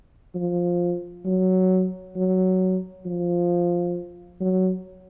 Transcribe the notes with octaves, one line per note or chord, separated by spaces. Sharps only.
F3
F#3
F#3
F3
F#3